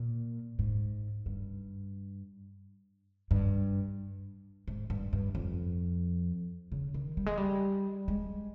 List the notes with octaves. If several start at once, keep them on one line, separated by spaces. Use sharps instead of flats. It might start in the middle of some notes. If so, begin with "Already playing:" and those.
Already playing: A#2
G#2
G2
G2
G#2
G2
G2
F2
C#3
D#3
G3
G#3
G3
G#3